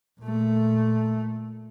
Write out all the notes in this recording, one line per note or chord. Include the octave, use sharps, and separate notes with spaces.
A#2 A3